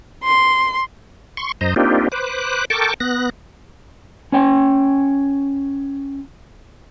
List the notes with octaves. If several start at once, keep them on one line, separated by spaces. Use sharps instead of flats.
C6
C6 C#6
F#2 C5 D#5 A#5
A#3 C4 D4 D#4 F4 G4
B4 C5 D6 F#6
A4 A#4 G5 A5 C#6 D6
B3 F#6 A#6
C#4 C#5 G5